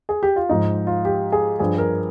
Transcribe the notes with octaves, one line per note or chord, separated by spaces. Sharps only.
G#4
G4
F4
G#2 F3 D#4
F4
G4
G#4
G2 F3 G#4
A#4